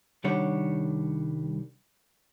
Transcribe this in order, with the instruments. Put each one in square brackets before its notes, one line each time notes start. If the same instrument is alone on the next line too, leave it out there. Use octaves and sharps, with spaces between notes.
[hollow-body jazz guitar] C2 D#3 G3 D4 C#5 F#5